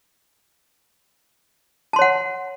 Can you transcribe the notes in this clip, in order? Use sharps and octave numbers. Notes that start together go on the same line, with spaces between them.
C#5 F#5 A5 C6